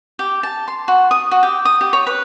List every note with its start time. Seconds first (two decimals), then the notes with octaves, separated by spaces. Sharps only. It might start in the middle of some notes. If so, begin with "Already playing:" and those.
0.19 G4
0.43 A5
0.68 C6
0.88 F#4
1.11 D#6
1.31 F#4
1.43 G4
1.65 D#6
1.81 G4
1.93 C#5
2.07 B4